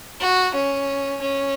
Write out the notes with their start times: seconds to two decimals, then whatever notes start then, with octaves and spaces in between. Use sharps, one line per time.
0.20 F#4
0.54 C#4
1.21 C#4